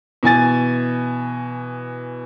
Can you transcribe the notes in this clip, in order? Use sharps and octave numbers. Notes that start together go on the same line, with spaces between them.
B2 E3 G#5 A6